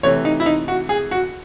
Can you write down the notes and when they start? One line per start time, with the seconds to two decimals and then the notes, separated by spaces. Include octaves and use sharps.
0.03 C3 E3 A3 C#5
0.25 D#4
0.40 E4
0.46 D#4
0.68 F#4
0.89 G#4
1.11 F#4